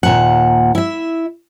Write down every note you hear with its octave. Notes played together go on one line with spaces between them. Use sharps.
D#2 A#2 F#5
E4 E5